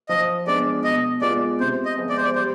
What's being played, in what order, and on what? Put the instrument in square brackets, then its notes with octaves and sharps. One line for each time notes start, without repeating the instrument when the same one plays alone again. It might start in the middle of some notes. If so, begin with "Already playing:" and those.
[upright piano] F3 [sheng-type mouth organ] D#5
[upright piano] G#3 B3 D4 [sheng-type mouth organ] D5
[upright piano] B2 [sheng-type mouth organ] D#5
[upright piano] G#3 B3 F4 [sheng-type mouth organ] D5
[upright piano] C3 [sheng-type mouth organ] C5
[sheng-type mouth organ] D#5
[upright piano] F3 G#3 B3
[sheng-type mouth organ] D5
C5
D5
[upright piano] G3 [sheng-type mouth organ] C5